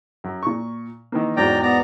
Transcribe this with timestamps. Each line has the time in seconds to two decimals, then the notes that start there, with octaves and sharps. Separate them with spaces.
0.24 F#2
0.43 A#2 C#6
1.12 D#3 E3 A#3
1.37 E2 G#2 F#3 D5 G5 A#5
1.63 B3 D5 A#5